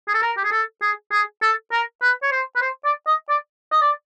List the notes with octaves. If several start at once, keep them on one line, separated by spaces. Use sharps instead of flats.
G#4
A4
A#4
G4
G#4
A4
G#4
G#4
A4
A#4
B4
C#5
C5
B4
C5
D5
D#5
D5
D#5
D5